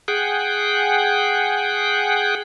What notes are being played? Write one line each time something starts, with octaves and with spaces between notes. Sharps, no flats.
G#4 F#5 G5